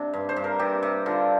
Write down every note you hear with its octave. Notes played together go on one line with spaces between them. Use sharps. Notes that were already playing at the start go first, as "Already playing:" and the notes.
Already playing: C3 D4
G2
C5
G2
A#4
C3 G4
C3
D3 F4